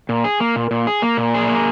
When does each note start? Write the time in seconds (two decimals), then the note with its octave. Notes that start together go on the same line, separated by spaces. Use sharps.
0.09 A#2
0.24 G#4
0.40 A#3
0.56 A#2
0.71 A#2
0.87 G#4
1.02 A#3
1.17 A#2
1.34 G#4
1.49 A#3